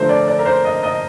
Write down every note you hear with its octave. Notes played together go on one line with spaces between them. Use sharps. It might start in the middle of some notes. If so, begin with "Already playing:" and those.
Already playing: D3 F3 A3 A#4 C5
D5
D5
A#4
C5
D#5
D#5